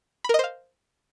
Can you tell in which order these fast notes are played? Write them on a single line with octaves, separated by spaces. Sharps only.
B5 A#4 D#5 C5 F5